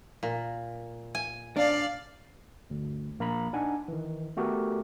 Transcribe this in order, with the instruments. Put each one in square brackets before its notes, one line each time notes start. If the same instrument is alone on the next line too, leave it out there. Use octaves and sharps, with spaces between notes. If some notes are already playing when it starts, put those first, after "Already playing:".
[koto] A#2
G#5
[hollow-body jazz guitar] D4 [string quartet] D5 F5
[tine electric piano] G1 D2
A#1 A#3 A#5 B5
D4 D#4 F#5 G#5
D#3 E3
A3 B3 F#4 G4 A4 A#4